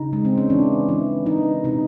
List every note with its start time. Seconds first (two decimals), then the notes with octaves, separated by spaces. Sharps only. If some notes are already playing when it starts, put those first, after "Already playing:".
Already playing: C#3 D#4
0.13 G#3
0.25 C4
0.37 C#4
0.50 E3 D4
0.89 E3
1.26 E3 D#4
1.64 C3 D#4